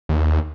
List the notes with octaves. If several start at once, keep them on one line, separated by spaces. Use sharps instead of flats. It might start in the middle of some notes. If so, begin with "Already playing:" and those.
D#2